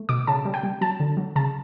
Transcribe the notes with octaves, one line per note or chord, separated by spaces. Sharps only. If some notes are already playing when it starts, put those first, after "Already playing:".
Already playing: A3
B2 D6
C#3 A5
G3
G5
G3
F#3 A5
D3
F#3
C#3 A5